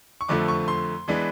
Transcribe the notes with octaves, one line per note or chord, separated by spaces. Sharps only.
C#6
F2 D3 F3 A3 D6
C#6
C6
E3 G#3 B3 D4